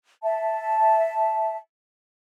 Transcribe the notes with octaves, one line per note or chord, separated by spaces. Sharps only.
E5 A5